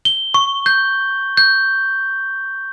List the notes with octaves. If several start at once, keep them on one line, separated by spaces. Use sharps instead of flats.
G7
C#6
G6
G6